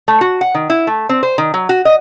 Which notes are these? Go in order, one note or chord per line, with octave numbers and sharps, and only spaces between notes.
A3
F#4
F#5
D#3
E4
A3
C4
C5
D#3
F#3
F#4
D#5